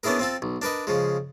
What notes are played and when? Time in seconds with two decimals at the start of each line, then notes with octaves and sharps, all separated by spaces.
0.03 B3 C#4 D4 E4 G#4 A#4
0.19 C4 F4 A4
0.42 B1
0.62 D4 A#4 B4 D#5
0.87 C#3 F3 G#3